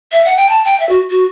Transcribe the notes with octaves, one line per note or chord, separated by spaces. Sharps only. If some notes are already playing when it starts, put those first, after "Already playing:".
E5
F#5
G5
A5
G5
E5
F#4
F#4